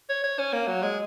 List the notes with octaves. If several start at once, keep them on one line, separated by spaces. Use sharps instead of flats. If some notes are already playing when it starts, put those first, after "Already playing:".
C#5
C#5
C#4
A#3
F#3
G#3